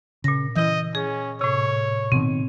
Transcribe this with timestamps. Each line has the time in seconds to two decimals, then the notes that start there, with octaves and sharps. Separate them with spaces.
0.24 A#2 C#3 A#6
0.56 E3 E4 D#5 G6
0.95 C#4 G#4
1.41 A2 C3 C#5
2.12 B2 D#3 C4